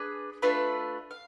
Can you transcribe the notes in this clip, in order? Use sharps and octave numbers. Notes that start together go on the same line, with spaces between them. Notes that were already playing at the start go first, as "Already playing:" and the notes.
Already playing: D4 G#4 B4
A3 D4 F4 B4
F5